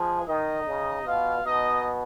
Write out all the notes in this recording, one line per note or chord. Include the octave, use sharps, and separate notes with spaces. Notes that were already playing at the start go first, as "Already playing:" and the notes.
Already playing: F3 G#3 G#4
D#3 D#4 D#5
C#3
B2 F4 F5
B2 D#4 D#5